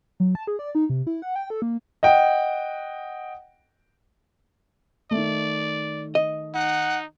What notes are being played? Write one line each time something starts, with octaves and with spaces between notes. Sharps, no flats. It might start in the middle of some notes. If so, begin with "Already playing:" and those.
F#3
A5
G#4
D5
D#4
C3
E4
F#5
G5
A4
A#3
D#5 F#5 G5
D#3 A3 D5
D#5
D#4 F#5